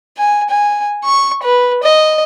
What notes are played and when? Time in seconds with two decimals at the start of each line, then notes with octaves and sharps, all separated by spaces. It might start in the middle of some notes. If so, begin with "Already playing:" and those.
0.17 G#5
0.50 G#5
1.05 C#6
1.43 B4
1.83 D#5